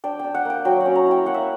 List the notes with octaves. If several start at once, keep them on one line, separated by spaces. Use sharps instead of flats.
D4 G5
D4 G5
F#5
A#3 G5
F#3 G5
F#5
C#4
A#5
E4 G5
A#3 F#5
E5